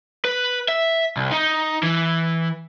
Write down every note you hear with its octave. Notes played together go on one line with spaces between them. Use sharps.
B4
E5
C2
D#4
E3